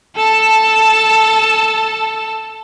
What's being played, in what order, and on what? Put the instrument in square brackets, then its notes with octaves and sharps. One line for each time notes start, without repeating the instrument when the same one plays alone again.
[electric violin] A4 A5